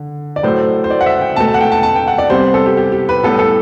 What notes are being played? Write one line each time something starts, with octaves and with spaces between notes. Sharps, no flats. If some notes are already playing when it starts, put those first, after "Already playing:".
Already playing: D3
D5
A2 F#3 A3 C5
C5
D5
F#5
E5
G5
B2 A3 A5
A5
F#5
G5
A5
A5
G5
F#5
D5
C3 G3 B3 C5
A4
G4
G4
G4
B4
A2 G3 B3 A4
A4